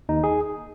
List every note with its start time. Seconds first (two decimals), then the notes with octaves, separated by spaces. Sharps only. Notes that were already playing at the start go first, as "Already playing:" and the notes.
0.09 D#2 D#4
0.24 G#4